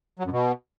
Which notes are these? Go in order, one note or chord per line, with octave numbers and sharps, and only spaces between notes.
F#3
F#2
B2